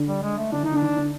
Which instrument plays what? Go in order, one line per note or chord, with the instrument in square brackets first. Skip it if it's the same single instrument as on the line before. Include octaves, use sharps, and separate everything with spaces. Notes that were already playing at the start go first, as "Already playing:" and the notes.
Already playing: [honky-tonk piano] D3
[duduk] G3
G#3
A3
[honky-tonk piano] D3 [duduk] D4
[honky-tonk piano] D#3 [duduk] D#4
[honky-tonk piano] D3
[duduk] D4
[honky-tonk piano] D#3
D3